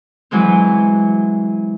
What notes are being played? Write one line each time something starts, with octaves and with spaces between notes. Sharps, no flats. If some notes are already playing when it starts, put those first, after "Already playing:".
E3 F#3 G#3 C4